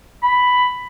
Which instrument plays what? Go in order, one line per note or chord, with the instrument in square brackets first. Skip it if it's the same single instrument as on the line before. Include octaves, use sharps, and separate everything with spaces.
[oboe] B5